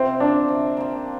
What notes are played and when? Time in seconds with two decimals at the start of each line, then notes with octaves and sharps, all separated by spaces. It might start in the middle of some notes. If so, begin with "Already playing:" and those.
Already playing: C3 C4 F4 C5
0.20 F3 A#3 D4
0.48 C3
0.77 F3 A#3